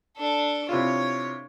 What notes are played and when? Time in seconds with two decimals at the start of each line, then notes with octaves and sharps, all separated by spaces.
0.17 D4 A4
0.69 C3 E4 F4 C#5